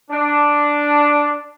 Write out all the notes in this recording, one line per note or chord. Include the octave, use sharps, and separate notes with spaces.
D4